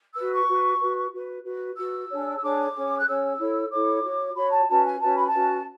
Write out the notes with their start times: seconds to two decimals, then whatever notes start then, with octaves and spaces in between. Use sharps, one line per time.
0.15 F#4 B4 E6
0.32 C#6
0.48 F#4 B4
0.80 F#4 B4
1.12 F#4 B4
1.45 F#4 B4
1.77 F#4 B4 E6
2.10 D4 G#4 C#5
2.37 E6
2.42 D4 G#4 C#5 D6
2.74 C#4 G#4 C#5
2.97 F#6
3.06 C#4 G#4 C#5 E6
3.38 E4 A4 C#5
3.71 E4 A4 C#5 D6
4.03 F#4 C#5
4.35 F#4 C#5 B5
4.52 A5
4.68 C#4 F#4 B4 A5
4.85 G#5
5.00 C#4 F#4 B4 A5
5.14 B5
5.28 A5
5.33 C#4 F#4 B4